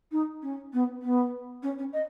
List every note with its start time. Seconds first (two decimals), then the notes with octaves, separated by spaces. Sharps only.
0.12 D#4
0.42 C#4
0.73 B3
1.02 B3
1.63 C#4
1.78 C#4
1.93 D#5